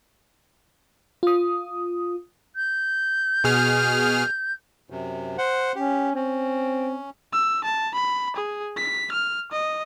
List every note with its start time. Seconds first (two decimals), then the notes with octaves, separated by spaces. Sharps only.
1.23 F4 D#6
2.56 G6
3.44 B2 G#4 F6
4.90 F#2 C3
5.38 C5 F#5
5.75 C#4 G4
6.15 C4 C#4
7.33 E6
7.64 A5
7.94 B5
8.36 G#4
8.77 B6
9.12 F6
9.52 D#5